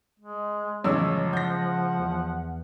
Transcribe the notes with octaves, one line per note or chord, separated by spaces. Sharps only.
G#3
A1 F#2 C#3 F3 G#3 C#5 E6
F#5 G6 A#6
E2